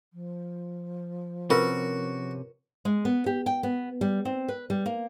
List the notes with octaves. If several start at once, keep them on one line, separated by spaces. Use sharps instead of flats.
F3
C3 C#4 F4 F#4 A#4 B4
G#3
B3
G4
G5
B3
G3
C4
B4
G3
A#3